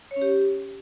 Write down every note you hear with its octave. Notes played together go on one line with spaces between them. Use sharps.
C#5
C#4
G4